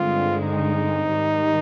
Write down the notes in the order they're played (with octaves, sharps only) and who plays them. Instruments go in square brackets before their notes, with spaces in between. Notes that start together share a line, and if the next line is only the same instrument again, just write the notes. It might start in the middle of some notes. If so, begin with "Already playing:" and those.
Already playing: [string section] G2 D3 G#3 C4 [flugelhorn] F4
[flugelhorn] D#4
[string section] G#2 D#3 G3